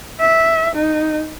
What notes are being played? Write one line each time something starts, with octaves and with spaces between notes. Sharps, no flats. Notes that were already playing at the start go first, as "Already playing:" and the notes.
E5
D#4